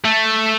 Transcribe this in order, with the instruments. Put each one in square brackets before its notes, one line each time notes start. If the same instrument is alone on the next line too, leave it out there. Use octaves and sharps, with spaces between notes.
[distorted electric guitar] A3